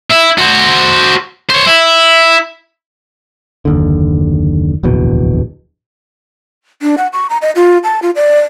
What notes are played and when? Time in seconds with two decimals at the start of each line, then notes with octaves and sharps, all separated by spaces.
0.10 E4
0.38 F#4 C5
1.50 C5 C#5
1.67 E4
3.65 F#1 D#2 D3
4.83 D1 A#1 E2 B2
6.82 D4
6.98 F#5
7.13 C#6
7.30 A#5
7.42 D#5
7.56 F4
7.84 A5
8.02 F4
8.16 D5